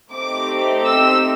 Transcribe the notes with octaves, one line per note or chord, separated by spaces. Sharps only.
A3 C4 D#4 G4 D6
E6